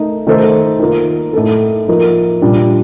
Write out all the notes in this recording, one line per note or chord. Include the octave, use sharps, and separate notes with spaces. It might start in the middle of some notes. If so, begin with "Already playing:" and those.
Already playing: A3 D#4 A#4
D#3 A3 D#4 A4 C5
D#3 A#3 F4 A#4
A2 A3 D#4 A4
F3 A#3 D#4 A#4
A#2 G3 D4